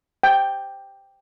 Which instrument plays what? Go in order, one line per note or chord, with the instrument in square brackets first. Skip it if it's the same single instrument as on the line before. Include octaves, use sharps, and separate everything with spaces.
[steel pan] G5